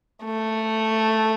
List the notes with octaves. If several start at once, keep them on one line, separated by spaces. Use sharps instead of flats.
A3